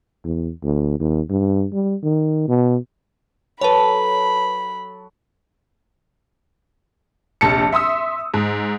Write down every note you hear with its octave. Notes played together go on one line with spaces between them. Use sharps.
E2
D2
D#2
G2
G3
D#3
B2
F#3 A4 B4 C#5 A5 B5
F1 A#1 A5 C#7
E5 C6 D#6 E6
G#2